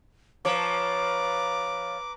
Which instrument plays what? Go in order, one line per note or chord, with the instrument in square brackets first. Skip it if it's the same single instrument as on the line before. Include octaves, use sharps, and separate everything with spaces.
[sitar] F3 C#5 [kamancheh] B4 A#5 [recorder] D6